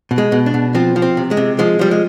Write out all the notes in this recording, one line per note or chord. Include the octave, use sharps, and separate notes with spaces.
B2
G#3
B2
D4
B2
F3 C4
F3
C4
C3
G#3
C3
F3 G#3
F3 G3
G#3